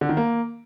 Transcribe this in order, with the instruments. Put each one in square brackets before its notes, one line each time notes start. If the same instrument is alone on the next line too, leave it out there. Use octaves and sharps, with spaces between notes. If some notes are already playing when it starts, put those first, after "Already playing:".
[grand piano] D3
D#3
A#3